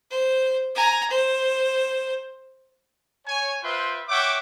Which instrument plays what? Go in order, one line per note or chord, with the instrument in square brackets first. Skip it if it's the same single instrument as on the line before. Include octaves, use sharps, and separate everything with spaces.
[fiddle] C5
G#5 A#5
C5
[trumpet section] C#5 G#5
F4 B4 C5 E5 G5 C6
C#5 E5 F#5 G5 D6